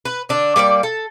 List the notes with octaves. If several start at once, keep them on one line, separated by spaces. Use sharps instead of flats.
B4
D3 D4
G3 A#3 B4 D5
A4